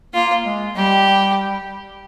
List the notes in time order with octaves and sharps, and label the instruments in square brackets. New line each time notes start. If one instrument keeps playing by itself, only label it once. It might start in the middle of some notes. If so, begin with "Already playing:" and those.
[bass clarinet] A#3 [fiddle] F4
[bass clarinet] G#3
[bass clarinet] G3 [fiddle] G4